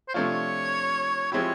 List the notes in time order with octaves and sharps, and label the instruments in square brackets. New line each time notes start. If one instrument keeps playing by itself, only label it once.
[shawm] C5
[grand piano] C3 F3 A3 D4 F4 [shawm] C#5
[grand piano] F3 G#3 C4 E4 G4 [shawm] C#5